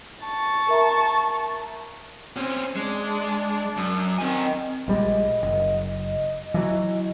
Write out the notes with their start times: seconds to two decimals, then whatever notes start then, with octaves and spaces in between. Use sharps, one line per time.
0.25 A5 C#6
0.68 A#4 E5 A#5
2.36 C4 C#4 C5
2.76 G#3 D4
3.77 F#2
4.18 D#3 C4 G#5
4.88 A#1 G3 G#3 D#5
5.43 F#1
6.54 E3 F#3